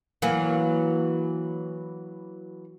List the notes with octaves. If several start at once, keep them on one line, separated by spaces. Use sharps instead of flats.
E3 F#3 A#3